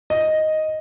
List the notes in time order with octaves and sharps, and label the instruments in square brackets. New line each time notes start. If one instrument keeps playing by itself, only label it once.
[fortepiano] D#5